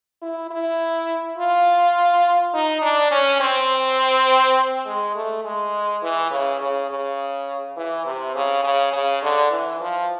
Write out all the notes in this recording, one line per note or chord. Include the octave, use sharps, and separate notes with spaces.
E4
E4
F4
D#4
D4
C#4
C4
G#3
A3
G#3
E3
C#3
C#3
C#3
E3
C3
C#3
C#3
C#3
D3
E3
F3